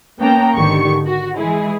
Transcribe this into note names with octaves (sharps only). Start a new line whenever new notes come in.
A#3 B3 C#4 G5 A5 A#5
G#1 D3 D#3 G4 C#6 C#7
F#4
E3 G#3 E4 G#4